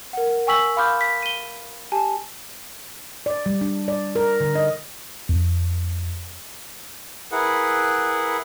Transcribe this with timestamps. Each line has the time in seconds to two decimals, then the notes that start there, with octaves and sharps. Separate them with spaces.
0.13 A#4 F#5
0.47 G5 G#5 C#6 E6 B6 F#7
0.77 F5 B5 C6 D6 F6 G6
1.01 B6
1.23 D#7 G7
1.92 G4 G#5 A5
3.26 D5
3.46 G3
3.61 D4
3.88 D5
4.16 A#4
4.40 D3
4.55 D#5
5.29 F2
7.32 E4 G#4 A#4 B4 F#5